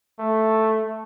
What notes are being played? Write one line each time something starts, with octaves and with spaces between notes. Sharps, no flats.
A3